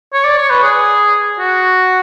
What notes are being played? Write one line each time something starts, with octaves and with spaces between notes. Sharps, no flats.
C#5
D5
C#5
B4
G#4
F#4